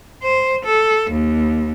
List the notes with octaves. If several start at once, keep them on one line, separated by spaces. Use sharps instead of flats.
C5
A4
D#2